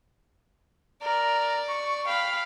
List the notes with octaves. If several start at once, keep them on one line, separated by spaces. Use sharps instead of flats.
A#4 D5
C#6
F5 G5 B5